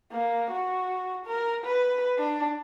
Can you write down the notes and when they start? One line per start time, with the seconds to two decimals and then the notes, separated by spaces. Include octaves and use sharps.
0.12 A#3
0.51 F#4
1.26 A#4
1.65 B4
2.19 D4